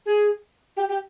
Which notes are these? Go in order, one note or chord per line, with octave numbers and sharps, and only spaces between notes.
G#4
G4
G4